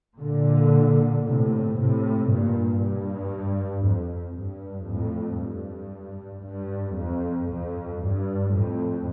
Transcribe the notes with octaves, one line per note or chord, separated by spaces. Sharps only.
A#2 D3
A2 C3
A2 C3
G2 A#2
G2
F2
G2
F2 A2
G2
G2
F2
F2
G2
F2 A2